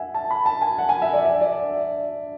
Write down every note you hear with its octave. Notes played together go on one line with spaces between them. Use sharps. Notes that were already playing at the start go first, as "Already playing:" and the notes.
Already playing: E5 F#5 G#5
A5
B5
A5
G#5
F#5
G#5
E5
D5
E5
D5